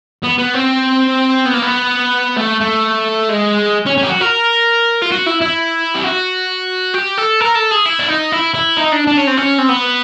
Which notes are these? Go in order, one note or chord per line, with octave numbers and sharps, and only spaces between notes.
B3
B3
C4
B3
A#3
B3
A3
A3
G#3
C#4
C#4
G4
F#4
A#4
F4
F#4
E4
E4
G4
F#4
G4
A4
A#4
A4
G#4
E4
D4
D#4
E4
E4
D#4
D4
D4
C#4
C4
C#4
C4
B3